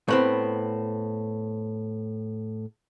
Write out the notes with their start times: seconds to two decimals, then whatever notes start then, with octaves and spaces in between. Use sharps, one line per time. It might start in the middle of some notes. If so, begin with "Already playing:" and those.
0.08 A2 B3 C4